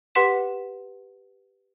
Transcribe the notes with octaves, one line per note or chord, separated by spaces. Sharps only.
G4 B4 F#5 C6 B6 E7